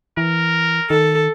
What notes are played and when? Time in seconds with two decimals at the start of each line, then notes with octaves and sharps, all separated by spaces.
0.17 E3 A#4
0.90 D#3 A4